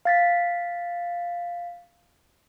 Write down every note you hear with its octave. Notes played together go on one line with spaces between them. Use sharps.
F5 A6 B6